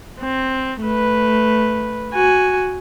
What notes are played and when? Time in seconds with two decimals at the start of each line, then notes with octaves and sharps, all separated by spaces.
0.20 C4
0.82 A3 B4
2.14 F#4 G#5